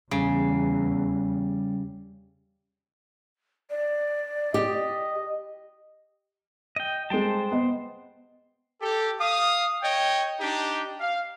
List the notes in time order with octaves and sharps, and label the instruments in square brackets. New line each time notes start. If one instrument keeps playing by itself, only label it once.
[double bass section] E2 [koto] C#3 [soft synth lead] G3
[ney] D5
[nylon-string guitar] G4 [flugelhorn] D#5
[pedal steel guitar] D#5 G5
[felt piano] G3 G#3 [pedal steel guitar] C5 G5 A5
[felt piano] B3 D#5
[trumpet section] G4 A4
F5 D#6
C#5 D#5 G5
D4 D#4 G4
F5